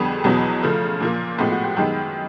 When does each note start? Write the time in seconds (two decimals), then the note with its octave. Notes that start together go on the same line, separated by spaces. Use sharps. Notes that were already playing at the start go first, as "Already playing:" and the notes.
Already playing: F2 D3 G3 B3 G#4
0.24 E2 B2 F#3 B3
0.62 C#3 F3 A3
1.00 A#2 F3 A#3
1.38 A2 F3 G#3 B3 G4
1.52 F#4
1.64 G4
1.77 F#2 D#3 G#3 B3 G4